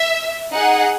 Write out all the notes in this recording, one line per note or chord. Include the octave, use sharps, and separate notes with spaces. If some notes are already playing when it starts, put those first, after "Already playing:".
Already playing: E5
D#4 G#4 F#5